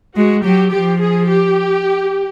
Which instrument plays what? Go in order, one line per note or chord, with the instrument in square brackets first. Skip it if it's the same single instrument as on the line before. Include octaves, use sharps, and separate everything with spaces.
[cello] G#3 [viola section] F#4
[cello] F#3 [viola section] G4
[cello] F3 [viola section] G4
[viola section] G#4
G4